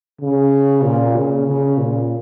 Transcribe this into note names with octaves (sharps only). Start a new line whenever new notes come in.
C#3
A#2
C#3
C#3
A#2